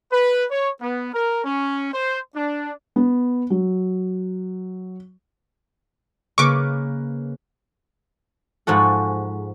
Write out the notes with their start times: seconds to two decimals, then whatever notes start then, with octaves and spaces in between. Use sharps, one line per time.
0.12 B4
0.51 C#5
0.81 B3
1.13 A#4
1.44 C#4
1.93 C5
2.35 D4
2.96 B3
3.50 F#3
6.38 C#3 A#3 B4 C#6 D6
8.67 G#2 F3 F#4 A4